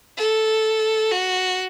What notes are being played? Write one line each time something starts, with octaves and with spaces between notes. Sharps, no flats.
A4
F#4